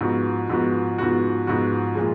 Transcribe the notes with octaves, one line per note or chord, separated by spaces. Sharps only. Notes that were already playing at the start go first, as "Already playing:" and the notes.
G#2 F3 B3 F#4
G#2 F3 B3 F#4
G#2 F3 B3 F#4
G#2 F3 B3 F#4
A#2 F3 G#3